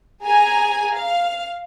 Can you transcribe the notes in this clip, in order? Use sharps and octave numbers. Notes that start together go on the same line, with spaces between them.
G#4 G#5 A#5
F5